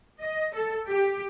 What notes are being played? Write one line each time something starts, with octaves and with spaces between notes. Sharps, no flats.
D#5
A4
G4